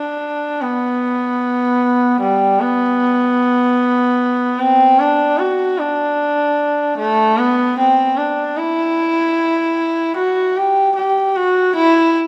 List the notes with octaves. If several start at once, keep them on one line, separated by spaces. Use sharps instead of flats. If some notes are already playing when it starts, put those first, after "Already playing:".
Already playing: D4
B3
G3
B3
C4
D4
F#4
D4
A3
B3
C4
D4
E4
F#4
G4
G4
F#4
E4